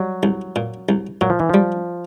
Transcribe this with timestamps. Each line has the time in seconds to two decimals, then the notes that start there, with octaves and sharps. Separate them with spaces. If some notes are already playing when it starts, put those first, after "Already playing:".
Already playing: F#3 G3
0.23 C2
0.56 A#2
0.89 C2
1.21 A#2 F#3
1.30 F3
1.40 E3
1.49 F3 G3